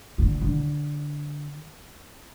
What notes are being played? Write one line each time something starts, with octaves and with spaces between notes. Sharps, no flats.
D3
D3